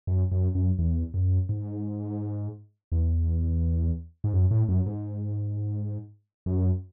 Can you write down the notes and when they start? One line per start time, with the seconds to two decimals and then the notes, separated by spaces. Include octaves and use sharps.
0.07 F#2
0.32 F#2
0.55 F#2
0.79 E2
1.14 F#2
1.49 G#2
2.92 E2
4.24 G#2
4.33 F#2
4.51 A2
4.69 F#2
4.86 G#2
6.46 F#2